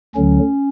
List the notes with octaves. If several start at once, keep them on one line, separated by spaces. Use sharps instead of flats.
D2 D3 F#3 C#4